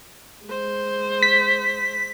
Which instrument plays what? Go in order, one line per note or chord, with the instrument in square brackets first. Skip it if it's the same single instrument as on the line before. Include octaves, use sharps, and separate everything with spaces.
[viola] G#3 C5
[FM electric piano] B6